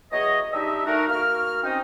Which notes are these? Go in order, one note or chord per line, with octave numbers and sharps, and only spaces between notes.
E3 F#3 B3 G#4 C#5 D#5
G3 D4 D#4 G4 D#5 E5
A3 D#4 F#4 A#4
A#3 F#4 F6
C4 C#4 D#4